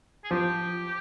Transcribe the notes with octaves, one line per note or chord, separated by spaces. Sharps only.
G#4
F3 G4